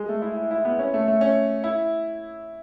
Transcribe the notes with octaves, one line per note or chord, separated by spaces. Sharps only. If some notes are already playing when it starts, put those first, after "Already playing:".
Already playing: G#3
A3
E4
E4
E4
B3
C#4
A3
A3
C#4
E4